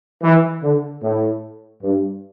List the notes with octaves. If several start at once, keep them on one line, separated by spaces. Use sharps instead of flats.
E3
D3
A2
G2